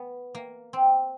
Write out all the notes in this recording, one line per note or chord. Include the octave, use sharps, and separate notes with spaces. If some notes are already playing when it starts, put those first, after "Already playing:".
Already playing: B3
A#3
C4